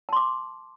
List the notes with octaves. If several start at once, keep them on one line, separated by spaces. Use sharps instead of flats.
A5 C6 D6